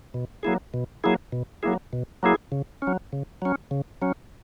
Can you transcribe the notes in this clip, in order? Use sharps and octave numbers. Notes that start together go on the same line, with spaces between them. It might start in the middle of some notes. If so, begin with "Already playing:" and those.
B2
F#3 A#3 E4 G#4
B2
F#3 A#3 E4 G#4
B2
F#3 A#3 E4 G#4
B2
F#3 A#3 E4 G#4
C#3
C#4
F#3
C#3
F#3 C#4
C#3
F#3 C#4